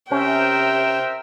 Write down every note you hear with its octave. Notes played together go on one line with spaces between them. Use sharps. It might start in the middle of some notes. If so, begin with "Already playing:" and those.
C3 C#4 A#4 C5 E5 G5